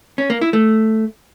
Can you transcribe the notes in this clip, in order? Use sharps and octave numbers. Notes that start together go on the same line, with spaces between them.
C#4
A#3
E4
A3